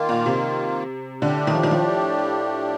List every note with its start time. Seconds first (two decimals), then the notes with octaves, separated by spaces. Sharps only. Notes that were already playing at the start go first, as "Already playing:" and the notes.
Already playing: D#3 A#3 F4
0.09 A#2
0.26 C3
1.22 A2 D3 A3 D4 G4
1.47 D#3
1.54 F3
1.63 D#3
1.71 F3